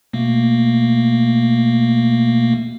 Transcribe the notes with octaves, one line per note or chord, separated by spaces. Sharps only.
B2 A3 A#3